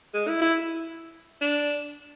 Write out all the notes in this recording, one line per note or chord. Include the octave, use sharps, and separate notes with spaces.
G#3
E4
E4
D4